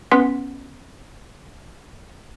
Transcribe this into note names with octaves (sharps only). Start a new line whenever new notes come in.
B3 C#4 B4 F#5 C6 B6